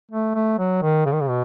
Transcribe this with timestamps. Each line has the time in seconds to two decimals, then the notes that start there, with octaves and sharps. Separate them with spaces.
0.12 A3
0.35 A3
0.58 F#3
0.82 D#3
1.06 C#3
1.13 D#3
1.21 C#3
1.29 B2